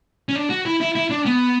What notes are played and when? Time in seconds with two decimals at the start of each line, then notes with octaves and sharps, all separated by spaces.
0.29 C#4
0.35 D4
0.50 F#4
0.66 E4
0.80 E4
0.95 E4
1.10 D4
1.25 B3